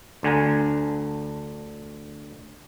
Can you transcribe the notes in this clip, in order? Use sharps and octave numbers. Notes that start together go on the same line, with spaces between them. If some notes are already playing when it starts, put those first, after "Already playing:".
D2 D3 G#5 A#5